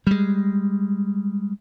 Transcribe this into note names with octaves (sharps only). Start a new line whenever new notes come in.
G3 G#3